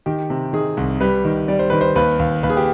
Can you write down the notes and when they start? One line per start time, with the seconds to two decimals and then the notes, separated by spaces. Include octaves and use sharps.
0.06 D#3 G4
0.30 C3
0.53 D#3 G#4
0.77 C2
1.01 G3 B4
1.25 D#3
1.48 G3 D5
1.59 C5
1.70 D#3 B4
1.81 C5
1.95 D#2 B4
2.19 D#2
2.43 D#2 B4
2.50 G#4
2.57 G4